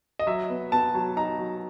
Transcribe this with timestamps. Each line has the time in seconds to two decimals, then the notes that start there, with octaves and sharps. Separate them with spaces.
0.19 D#5
0.27 F#3 E5
0.50 B3
0.72 B3 A5
0.94 F#3
1.16 D#4 A#5
1.39 F#3